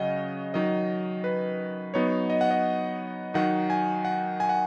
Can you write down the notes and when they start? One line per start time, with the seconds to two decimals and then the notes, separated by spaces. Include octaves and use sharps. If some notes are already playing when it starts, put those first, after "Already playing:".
Already playing: C#3 F#3 C#4 D#5 F#5
0.54 D#3 F#3 D#4 D#5
1.24 B4
1.94 F#3 B3 D#4 C#5
2.30 D#5
2.41 F#5
2.51 D#5
3.34 D#3 F#3 D#4 F#5
3.70 G#5
4.05 F#5
4.40 G#5
4.49 F#5